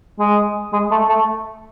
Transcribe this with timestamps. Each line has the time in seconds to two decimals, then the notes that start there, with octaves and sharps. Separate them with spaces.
0.19 G#3
0.73 G#3
0.91 A3
1.09 A3